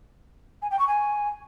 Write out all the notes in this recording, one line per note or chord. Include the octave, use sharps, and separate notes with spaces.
G#5
G5
C#6
G#5